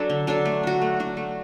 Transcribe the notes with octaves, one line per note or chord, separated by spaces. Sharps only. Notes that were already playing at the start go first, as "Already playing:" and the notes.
Already playing: F#3 D4 A4
D3
F#3 D4 A4
A3
D4 F#4
A3
D4 F#4
A3